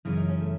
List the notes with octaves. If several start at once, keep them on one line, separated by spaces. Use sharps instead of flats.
F#2 C#3 E3 B3
D#4
C#4
A3